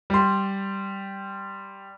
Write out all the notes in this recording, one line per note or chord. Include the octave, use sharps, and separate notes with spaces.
G3 C6